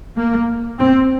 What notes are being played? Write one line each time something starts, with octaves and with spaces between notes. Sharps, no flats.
A#3
C4